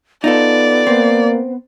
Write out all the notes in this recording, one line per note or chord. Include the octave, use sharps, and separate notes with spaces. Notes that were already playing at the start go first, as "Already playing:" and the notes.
B3 D#4 F4 A4 D5
A#3 C4